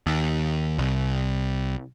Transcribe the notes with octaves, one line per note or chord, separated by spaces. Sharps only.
D#2
C2